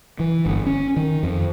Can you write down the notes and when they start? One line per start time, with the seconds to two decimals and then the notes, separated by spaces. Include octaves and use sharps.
0.20 E3
0.46 G1
0.66 C#4
0.96 D#3
1.23 F2